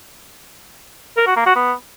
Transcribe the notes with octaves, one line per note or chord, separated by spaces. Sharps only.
A#4
F#4
A#3
F#4
B3